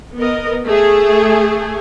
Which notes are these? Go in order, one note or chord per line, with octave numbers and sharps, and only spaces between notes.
B3 A#4 D#5
A3 G#4